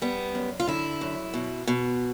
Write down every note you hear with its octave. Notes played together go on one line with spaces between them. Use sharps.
G3 B3
F#2
F4
D3 E4
F#2
B2
B2